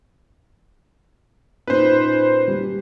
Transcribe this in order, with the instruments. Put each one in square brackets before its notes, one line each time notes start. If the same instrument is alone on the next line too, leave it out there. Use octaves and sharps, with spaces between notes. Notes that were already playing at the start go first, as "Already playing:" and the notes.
[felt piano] A#2 C#4 D#4 [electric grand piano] B4 C5
[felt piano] G3